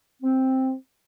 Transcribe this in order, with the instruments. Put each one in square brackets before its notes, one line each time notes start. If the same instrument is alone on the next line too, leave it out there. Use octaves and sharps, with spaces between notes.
[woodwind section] C4